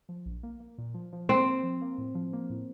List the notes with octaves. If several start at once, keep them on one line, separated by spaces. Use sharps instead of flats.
F3
A#1
A#3
A#3
A#2
F3
F3
A#3 C4
A#3
F3
A#3
A2
F3
A#3
A2